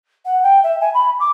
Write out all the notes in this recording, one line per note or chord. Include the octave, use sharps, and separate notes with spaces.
F#5
G5
E5
G#5
B5
D6